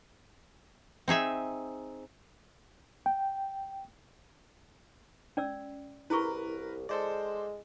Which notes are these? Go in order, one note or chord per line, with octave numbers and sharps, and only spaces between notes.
C4 D#4 G#4 E5
G5
C#4 D5 E6
C2 E4 G#4 A#4 B4 C#6
G#3 A4 C5 D5